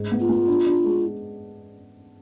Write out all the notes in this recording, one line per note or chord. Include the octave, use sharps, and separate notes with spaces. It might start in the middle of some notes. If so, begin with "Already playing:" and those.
Already playing: G#2 D#4
B3
F4
B3
D4
D4
G#3